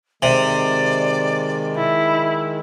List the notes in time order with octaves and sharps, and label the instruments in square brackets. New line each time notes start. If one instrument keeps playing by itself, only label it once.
[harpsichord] C3 [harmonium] D#3 G#3 [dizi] D5
[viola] E4